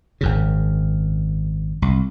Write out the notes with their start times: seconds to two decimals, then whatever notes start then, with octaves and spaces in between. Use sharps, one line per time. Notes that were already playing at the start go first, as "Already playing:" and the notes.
0.21 G#1 F#2 C#3
1.82 C2